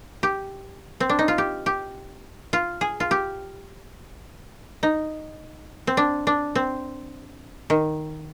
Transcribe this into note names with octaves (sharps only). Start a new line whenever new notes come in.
G4
C4
D4
D#4
F4
G4
G4
F4
G#4
F4
G4
D#4
C4
D4
D4
C4
D#3